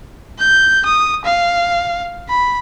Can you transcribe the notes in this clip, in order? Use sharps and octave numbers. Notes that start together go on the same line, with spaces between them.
G6
D#6
F5
B5